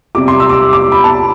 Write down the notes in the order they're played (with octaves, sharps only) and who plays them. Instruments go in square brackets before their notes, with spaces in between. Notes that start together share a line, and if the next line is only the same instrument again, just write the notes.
[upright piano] C3 G3 D6
C6
E6
D6
E6
D6
B5
A5